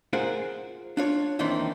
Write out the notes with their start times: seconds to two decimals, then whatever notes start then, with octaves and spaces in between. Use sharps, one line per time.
0.13 F4 G#4 A#4 C5 F#5
0.97 D4 F4 C#5
1.39 D#2 D#3 E3 C4 D4 C6